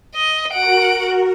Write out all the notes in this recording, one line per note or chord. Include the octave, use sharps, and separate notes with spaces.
D#5
F#4 A#4 F#5 D7